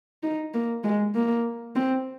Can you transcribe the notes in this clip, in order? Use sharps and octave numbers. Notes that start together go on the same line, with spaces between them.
D#4
A#3
G#3
A#3
C4